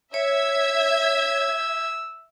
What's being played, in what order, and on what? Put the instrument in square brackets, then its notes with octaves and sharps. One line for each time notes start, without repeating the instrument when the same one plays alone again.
[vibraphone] C#5 [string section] E5 G#6 [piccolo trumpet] E6